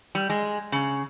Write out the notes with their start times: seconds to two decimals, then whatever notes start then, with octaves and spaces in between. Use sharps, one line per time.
0.15 G3
0.30 G#3
0.72 C#3